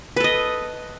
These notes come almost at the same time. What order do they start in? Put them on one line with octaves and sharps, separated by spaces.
B4 A4 D#5